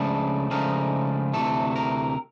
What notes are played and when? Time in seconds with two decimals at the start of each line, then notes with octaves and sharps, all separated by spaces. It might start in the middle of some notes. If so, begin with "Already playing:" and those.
Already playing: C#2 C#3 F3 A3 D4 A4
0.51 C#2 C#3 F3 A3 D4 A#4
1.34 D2 C3 E3 A3 A4
1.76 A#4